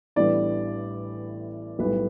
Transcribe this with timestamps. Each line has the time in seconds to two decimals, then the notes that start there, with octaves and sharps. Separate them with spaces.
0.16 A1 A2 G3 B3 D4 D5
1.79 B1 A2 G3 B4